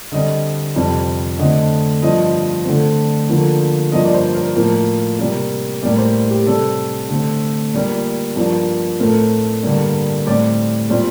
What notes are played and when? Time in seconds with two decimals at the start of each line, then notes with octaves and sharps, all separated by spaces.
0.12 D3 G3 C4 D#5
0.76 F2 C3 G3 C4
1.39 D3 A3 C4 D#5
2.02 G2 F3 C4 D#5
2.65 D3 A3 C4
3.29 D3 F3 A#3
3.92 G2 F3 A#3 D#5
4.05 D5
4.14 C5
4.35 A#4
4.56 A2 F3 A#3
5.19 C3 G3 A#3
5.83 A2 G3 A#3 D5
5.98 C5
6.31 G4
6.46 C3 G3 C4 A4
7.09 D3 A3 C4
7.73 A#2 G3 A#3
8.36 G2 F3 A#3
8.99 A2 A3 C4 A#4
9.63 G2 D3 G3 A#3
10.26 A2 G3 C4 D5
10.90 A#2 G3 C4